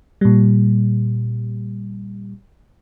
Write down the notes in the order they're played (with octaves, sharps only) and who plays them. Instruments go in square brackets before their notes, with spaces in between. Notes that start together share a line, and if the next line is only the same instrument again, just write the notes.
[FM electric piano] A#2 G3